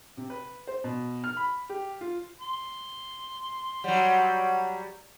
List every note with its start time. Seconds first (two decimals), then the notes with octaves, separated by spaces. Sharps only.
0.17 C3
0.30 B4
0.67 C5
0.84 B2
1.24 F6
1.37 B5
1.69 G4
2.01 F4
2.41 C6
3.84 F#3 G3 C#5 F#5